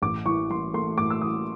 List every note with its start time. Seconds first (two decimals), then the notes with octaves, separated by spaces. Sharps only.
0.02 A1 D6
0.26 E3 C#6
0.50 E3 C6
0.74 A3 C6
0.98 A2 D6
1.10 E6
1.21 E3 D#6